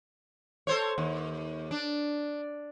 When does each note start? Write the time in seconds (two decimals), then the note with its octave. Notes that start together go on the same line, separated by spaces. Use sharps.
0.67 A4 C5 C#5
0.98 D#2
1.71 D4